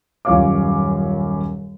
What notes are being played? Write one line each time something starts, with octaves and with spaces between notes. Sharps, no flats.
D#1 F#2 F4 C#5 F5 D6